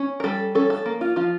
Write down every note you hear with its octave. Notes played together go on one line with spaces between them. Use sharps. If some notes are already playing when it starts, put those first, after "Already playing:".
Already playing: C#4
A#4
G3 A4
C#4 A4
A4
A#3
F4
F3 F4